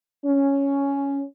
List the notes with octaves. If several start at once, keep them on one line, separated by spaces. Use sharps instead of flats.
C#4